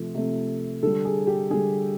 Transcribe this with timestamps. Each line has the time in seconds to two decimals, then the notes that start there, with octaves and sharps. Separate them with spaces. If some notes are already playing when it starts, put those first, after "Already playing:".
Already playing: C3 F3 A3
0.14 C3 F3 A3
0.83 D3 G3 A4
1.05 G#4
1.27 G4
1.50 D3 G3 G#4